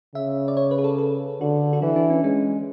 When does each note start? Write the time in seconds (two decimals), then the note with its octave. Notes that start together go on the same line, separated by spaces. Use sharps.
0.15 C#3 E5
0.48 D5
0.57 C#5
0.71 B4
0.78 G#4
0.84 A4
0.98 A4
1.41 D3 F#4
1.73 F#4
1.82 E3 E4
1.96 D4
2.10 C#4
2.24 G#3 C#4